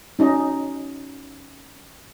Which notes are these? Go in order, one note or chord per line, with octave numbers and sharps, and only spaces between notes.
C#4 D#4 F#4 D#5